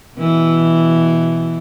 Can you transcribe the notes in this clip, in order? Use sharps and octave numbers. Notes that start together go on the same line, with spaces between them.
B2 E3